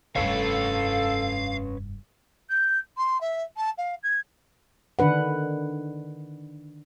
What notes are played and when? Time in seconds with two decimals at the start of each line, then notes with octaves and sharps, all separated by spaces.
0.16 F1 G2 C#4 A4 B4 C#5 F5
2.50 G6
2.97 C6
3.21 E5
3.57 A5
3.78 F5
4.03 G#6
4.99 D3 D#3 D4 B4 F#5